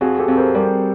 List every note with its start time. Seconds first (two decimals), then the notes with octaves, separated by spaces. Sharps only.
0.01 F2 F#4 G#4
0.19 G4 A4
0.28 F2
0.37 A#4 C5
0.55 G3 A#4 C5